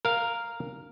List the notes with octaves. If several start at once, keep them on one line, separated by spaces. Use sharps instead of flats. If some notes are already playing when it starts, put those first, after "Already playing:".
A#4 F5